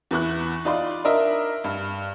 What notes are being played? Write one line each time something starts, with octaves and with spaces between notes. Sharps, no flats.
E2 B3 E4 C#6 F#6
D#4 F4 D5 B5 C6
D4 A#4 D#5 E5
G2